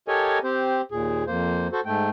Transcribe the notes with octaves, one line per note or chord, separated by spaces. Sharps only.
G4 A4 A#4 C#5 D#5 G#5
C4 G4 C5
D#2 A#2 G#4
F2 A#3 C5
F#4 A4 C5
G#2 A3 G5